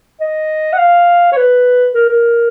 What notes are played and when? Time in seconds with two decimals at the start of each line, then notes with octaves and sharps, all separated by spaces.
0.21 D#5
0.73 F#5
0.78 F5
1.32 C#5
1.37 B4
1.94 A#4
2.09 A#4